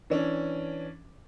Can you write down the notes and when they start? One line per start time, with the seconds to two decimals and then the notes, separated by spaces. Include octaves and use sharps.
0.10 E3 C#4 D4